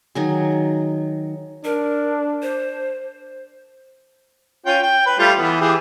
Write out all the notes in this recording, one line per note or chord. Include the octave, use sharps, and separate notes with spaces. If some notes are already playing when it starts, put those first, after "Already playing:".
D#3 F#3 G#4
D4 A#4
C5
C#4 F4 G5
G5
B4
G3 A3 F4
E3 B3
E3 G4 G#4